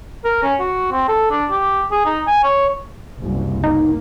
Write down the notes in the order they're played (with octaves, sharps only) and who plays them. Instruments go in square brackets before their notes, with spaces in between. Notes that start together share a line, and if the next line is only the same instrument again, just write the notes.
[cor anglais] A#4
C#4
F#4
C4
A4
D4
G4
G#4
D#4
G#5
C#5
[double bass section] F#1 C2
[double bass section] A#3 [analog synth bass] D#4